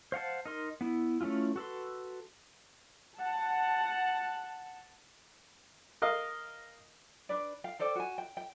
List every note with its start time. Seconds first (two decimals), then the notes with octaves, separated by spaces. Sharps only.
0.12 C5 F5 F#5 A5
0.46 D#4 A#4 C6
0.81 B3 E4
1.21 A3 C#4 D4 E4 F4
1.56 F#4 A4 B4 C6
3.18 F#5 A5
6.02 A#4 D#5 F5
7.29 D4 B4 D5
7.64 F5 G5
7.79 A4 C5 D5 G5
7.95 F#4 G#5
8.18 G5
8.37 G5